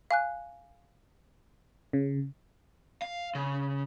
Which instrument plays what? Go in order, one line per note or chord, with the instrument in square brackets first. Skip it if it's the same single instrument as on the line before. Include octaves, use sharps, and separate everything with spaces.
[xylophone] F5 G#5 F#6
[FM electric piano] C#3
[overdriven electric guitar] F5
C#3